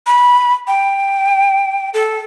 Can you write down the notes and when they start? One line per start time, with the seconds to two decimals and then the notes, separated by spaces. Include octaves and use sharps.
0.07 B5
0.67 G5
1.94 A4